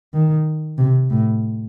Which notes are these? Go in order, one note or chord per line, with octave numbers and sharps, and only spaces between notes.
D#3
C3
A2